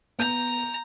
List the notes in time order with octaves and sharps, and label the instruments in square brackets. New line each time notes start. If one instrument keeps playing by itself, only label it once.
[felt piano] B3 G6 [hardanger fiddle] A#5